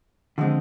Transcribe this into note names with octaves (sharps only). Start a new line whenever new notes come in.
D3 F3 G#3 C4